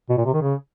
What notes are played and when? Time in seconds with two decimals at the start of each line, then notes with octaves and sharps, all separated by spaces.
0.09 B2
0.17 A#2
0.25 C3
0.33 D#3
0.41 C#3